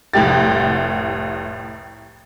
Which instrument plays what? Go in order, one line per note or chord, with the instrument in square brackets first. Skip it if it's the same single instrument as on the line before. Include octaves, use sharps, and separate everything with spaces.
[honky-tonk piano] F1 C2 A2 G4 A6